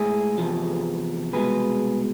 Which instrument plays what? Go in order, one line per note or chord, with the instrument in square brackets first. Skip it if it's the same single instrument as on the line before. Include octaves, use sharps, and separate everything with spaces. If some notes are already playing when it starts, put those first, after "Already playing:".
Already playing: [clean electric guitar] A2 G#3 E4 G#4
E2 C3 F3
C2 B2 G#3 G#4 B4